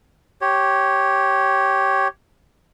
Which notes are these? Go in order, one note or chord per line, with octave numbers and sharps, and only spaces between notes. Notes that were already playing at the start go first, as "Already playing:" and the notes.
G4 C#5